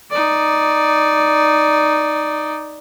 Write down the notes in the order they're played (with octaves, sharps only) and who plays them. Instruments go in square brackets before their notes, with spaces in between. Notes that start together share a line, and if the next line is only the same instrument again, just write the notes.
[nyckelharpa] D#4 D5